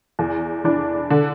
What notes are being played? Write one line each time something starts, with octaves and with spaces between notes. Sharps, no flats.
E2
E3 D4
D3